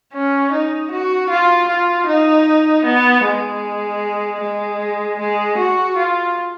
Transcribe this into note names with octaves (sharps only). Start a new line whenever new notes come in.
C#4
D#4
F#4
F4
F4
D#4
B3
G#3
G#3
G#3
F#4
F4